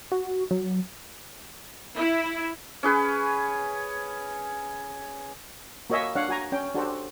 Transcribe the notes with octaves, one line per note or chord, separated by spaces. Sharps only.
F#4
F#3
E4
C#4 G#4 B4
A#3 F#4 C#5 D#5 E5 G#5
D4 C#5 F5 F#5
F#4 G#5 A#5
C#4 G5
D4 F#4 G4 A4 C5